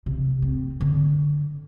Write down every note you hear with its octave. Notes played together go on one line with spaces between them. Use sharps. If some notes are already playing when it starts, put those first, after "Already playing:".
C3
C4
D3